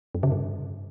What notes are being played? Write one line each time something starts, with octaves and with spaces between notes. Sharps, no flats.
F#2
C#3
G2